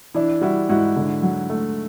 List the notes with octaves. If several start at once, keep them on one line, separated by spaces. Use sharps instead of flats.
E3 D4 E4
G3 E4 F#4
G#2 E4 F#4
D3
F#3
A3